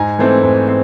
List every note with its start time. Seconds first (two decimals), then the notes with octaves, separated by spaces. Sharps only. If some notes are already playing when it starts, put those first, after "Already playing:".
Already playing: G#2 G#5 A#5
0.19 E3 A3 C4
0.43 G#2
0.68 C4